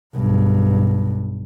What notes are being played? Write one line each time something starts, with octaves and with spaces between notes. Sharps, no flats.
B1 G2